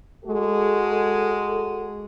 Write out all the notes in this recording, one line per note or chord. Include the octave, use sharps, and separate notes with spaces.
G#3 F#4 A4